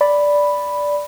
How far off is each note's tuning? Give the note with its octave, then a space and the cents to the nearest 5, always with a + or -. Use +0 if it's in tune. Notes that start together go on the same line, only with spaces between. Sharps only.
D5 -5 B5 +0